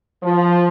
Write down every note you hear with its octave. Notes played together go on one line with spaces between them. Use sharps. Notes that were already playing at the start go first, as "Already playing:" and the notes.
F3